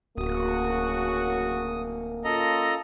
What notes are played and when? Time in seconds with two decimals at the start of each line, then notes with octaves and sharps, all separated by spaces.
0.18 D1 F#2 C#3 A#3 F#4 D#6
2.24 C#4 F4 A4 D#5 A#5